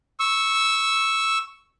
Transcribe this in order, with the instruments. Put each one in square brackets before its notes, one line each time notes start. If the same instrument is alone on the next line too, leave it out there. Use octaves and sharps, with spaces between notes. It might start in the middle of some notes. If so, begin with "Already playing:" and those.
[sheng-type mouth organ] C#6 E6